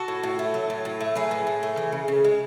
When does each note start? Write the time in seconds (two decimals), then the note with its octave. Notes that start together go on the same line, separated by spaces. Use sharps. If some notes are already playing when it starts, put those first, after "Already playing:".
Already playing: F#4 A4
0.08 A2
0.23 A2
0.39 A3
0.54 F#3
0.70 A2
0.85 A2
1.00 A3
1.15 F#3 G#4 B4
1.31 A2
1.47 A2
1.63 A3
1.77 E3
1.92 C#3
2.08 C#3
2.24 G#3